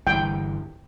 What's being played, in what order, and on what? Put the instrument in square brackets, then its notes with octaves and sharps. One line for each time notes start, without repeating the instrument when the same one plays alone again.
[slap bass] G1 E3 [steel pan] G5